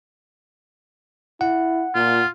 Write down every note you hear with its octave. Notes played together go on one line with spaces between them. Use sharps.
E4 F#5
A#2 F4